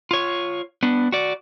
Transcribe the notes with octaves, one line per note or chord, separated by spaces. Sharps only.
F4 C#5
B3 D4
F#4 D5